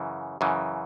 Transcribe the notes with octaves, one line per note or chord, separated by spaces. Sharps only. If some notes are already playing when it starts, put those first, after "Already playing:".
Already playing: F#2 C#3 E3
F#2 C#3 E3